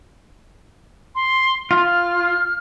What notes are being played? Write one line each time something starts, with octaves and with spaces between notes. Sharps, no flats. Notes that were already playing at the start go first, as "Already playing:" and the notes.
C6
F4 F6